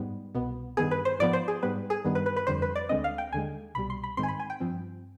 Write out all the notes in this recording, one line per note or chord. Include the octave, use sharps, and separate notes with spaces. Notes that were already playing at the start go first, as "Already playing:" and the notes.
Already playing: G#2 G3 B3
C2 B2 B3
G2 D#3 B3 G#4
B4
C5
G#2 F3 B3 D5
C5
G#4
G#2 G3 B3 B4
G#4
G2 D#3 G3 B3
B4
B4
B4
F2 D3 G3 C5
B4
D5
D2 D3 G#3 C4 D#5
F5
G5
D#2 D3 G#3 G#5
C2 B2 G3 B5
C6
B5
G#2 D#3 G#3 C4 C6
G#5
B5
G#5
G5
G2 F3 C4